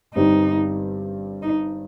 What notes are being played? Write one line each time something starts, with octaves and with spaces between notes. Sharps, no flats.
G1 G2 G3 C4 D#4 G4
D#4